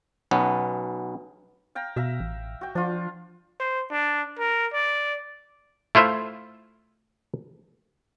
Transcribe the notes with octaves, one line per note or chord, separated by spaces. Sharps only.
B1 B2 B3 C#4
F5 G5 A#5
B2 E5 F5 A#5
A1
F#4 G5
F3 D4 F4
C5
D4
A#4
D5
A3 E4 F4 C5 E5